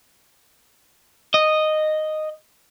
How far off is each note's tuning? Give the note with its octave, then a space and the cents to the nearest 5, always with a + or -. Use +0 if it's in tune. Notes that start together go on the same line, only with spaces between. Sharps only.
D#5 -5